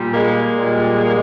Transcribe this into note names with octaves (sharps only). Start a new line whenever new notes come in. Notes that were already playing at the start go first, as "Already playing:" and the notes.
Already playing: A#2 G3
G#3 A#3
A#2 G3